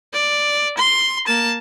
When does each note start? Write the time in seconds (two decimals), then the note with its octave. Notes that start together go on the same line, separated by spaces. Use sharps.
0.13 D5
0.78 C6
1.27 A#3 A5